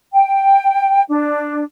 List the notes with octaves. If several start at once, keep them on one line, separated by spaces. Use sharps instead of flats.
G5
D4